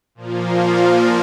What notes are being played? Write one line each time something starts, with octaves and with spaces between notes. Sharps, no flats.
A#2 F3 A#3 F4